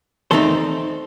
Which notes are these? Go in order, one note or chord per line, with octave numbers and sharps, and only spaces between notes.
E2 D#3 A3 C4 D#4 A4 C5